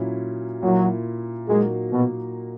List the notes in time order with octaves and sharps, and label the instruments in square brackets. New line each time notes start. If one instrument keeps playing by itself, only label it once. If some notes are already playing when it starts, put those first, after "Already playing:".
Already playing: [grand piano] A#2 F#3 C#4 E4
[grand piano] A#2 A#3 E4 [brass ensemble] F#3
[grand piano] A#2 F#3 A#3 D#4 F#4 [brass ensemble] G#3
[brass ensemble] B2